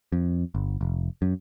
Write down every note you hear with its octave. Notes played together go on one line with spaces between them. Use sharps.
F2
G1
F1
F#2